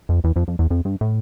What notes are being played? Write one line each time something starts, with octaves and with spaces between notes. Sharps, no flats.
F2
E2
F2
F2
E2
F2
G2
A2